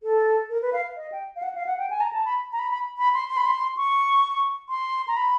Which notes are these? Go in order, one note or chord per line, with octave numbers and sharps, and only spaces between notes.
A4
A#4
B4
F5
D#5
G5
F5
F#5
F5
F#5
G5
G#5
A#5
A5
B5
A#5
B5
B5
B5
C6
C6
B5
C6
C#6
C6
A#5
B5